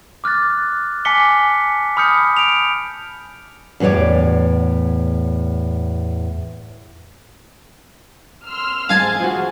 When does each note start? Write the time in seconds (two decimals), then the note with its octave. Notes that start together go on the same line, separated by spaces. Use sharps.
0.24 D6 F6 F#6 A6
1.05 G#5 A5 D6 B6 C#7 G7
1.97 B5 D#6 F6 G6 C#7
2.37 D7 F7
3.80 E2 A2 F#4 C#5 D5
8.48 C6 E6 F6
8.89 F2 G#2 G#4 C5 F5 G#5 A5
9.20 F3 F#4